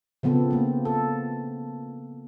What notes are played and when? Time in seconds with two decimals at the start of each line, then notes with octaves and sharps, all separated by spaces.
0.23 C#3 F3 B3 C4 A4
0.51 A#3 C4
0.85 A4